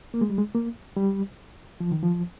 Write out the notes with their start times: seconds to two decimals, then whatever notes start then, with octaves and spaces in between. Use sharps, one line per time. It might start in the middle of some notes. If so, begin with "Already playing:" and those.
0.14 A#3
0.21 G#3
0.30 G3
0.38 G#3
0.55 A#3
0.96 G3
1.80 F3
1.91 D#3
2.03 F3